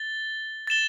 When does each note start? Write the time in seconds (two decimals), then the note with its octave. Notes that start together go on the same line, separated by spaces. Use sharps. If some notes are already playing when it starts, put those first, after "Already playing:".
Already playing: A6 G7
0.67 A6 E7 G7